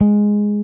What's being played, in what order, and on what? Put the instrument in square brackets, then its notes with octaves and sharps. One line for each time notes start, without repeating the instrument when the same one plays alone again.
[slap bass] G#3